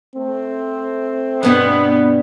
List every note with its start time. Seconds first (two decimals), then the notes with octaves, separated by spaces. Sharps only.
0.16 A3 C4
1.43 G2 B2 G3 B3